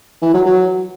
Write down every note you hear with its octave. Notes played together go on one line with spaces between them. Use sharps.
E3
F#3
F#3